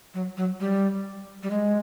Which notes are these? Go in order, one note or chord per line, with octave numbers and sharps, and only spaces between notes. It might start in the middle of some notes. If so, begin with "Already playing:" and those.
F#3
F#3
G3
G3
G#3